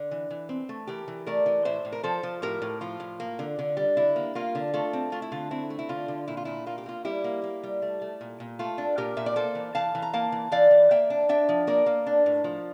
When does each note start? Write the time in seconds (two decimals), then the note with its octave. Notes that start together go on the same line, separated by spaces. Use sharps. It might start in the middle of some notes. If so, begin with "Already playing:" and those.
Already playing: D3
0.11 E3
0.31 E3
0.49 C4
0.69 A3
0.87 E3 G4 A#4
1.08 E3
1.26 A3 A#4 D5
1.46 E3
1.65 A2 C5 E5
1.85 A2
1.92 A#4
2.03 F3 A4 C5
2.23 F3
2.42 A2 G4 A#4
2.62 A2
2.81 F3 F4
3.00 A2
3.20 A#3
3.39 D3
3.59 D3
3.77 G3
3.97 D3 E4
4.16 A#3
4.35 A#3 F4
4.55 D3
4.74 A3 F4 A4
4.93 C4
5.12 A3 F4
5.22 E4
5.32 D3 F4
5.51 C4 E4
5.70 A3
5.79 E4
5.89 D3 F4
6.08 D3
6.28 A#2 E4
6.37 F4
6.45 A#2 E4
6.66 A#3 F4
6.78 G4
6.86 A#3 F4
7.05 G3 E4 G4
7.24 A#3
7.43 A#3
7.63 G3
7.82 A3
8.02 A3
8.21 A#2
8.40 A#2
8.59 A3 F4 A4
8.78 D4
8.98 A#2 G4 A#4
9.17 A#2 E5
9.26 D5
9.36 A#3 A4 C5
9.55 E3
9.75 E3 F5 A5
9.95 E3
10.02 A#5
10.13 A#3 F5 A5
10.32 E3
10.52 E3 D5 F5
10.71 E3
10.91 A#3 E5 G5
11.10 D4
11.29 D4 E5 G5
11.49 F3
11.67 A#3 A#4 D5
11.86 A#3
12.07 D4
12.26 A2
12.44 F3